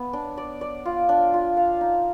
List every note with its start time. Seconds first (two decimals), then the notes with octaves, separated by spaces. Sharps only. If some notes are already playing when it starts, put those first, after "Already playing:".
Already playing: B3
0.13 D4
0.38 D5
0.61 D5
0.85 F4
1.09 D4
1.34 F4
1.57 F5
1.81 D#4